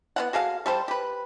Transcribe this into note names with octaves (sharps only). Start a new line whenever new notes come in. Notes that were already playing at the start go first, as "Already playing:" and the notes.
B3 D4 F#5
F#4 G#4 A4 F5
G3 A4 C5
G4 B4